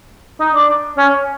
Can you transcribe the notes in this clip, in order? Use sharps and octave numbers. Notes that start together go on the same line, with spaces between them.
D#4
D4
C#4